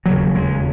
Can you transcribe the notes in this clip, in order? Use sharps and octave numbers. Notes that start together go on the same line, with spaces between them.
E1 D#2 C#3 F#3
G#3